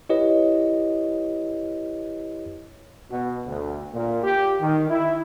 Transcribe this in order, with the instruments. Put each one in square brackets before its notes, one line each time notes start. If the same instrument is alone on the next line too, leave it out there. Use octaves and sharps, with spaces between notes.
[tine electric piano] E4 G4 B4 C#5 D#5
[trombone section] B2
D2
A#2
G4
D#3
E4